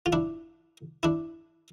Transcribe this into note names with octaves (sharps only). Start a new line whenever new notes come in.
F4
D4 E4
D4 E4